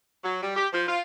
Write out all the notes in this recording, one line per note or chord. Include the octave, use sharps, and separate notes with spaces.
F#3
G3
G4
F3
F4